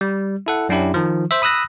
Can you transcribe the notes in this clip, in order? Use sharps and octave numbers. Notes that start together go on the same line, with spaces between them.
G3
E4 A4 F#5
F#2 C#4 D4 E4 G4
D#3 F3
C5 E5
B5 D#6 E6 F#6 A#6